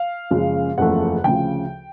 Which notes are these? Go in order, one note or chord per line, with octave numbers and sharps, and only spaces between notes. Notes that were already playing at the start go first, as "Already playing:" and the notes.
Already playing: F5
F#1 F#2 C#3 F3 G#3
F#1 E2 C#3 F3 A3 F#5
D2 C#3 F3 G5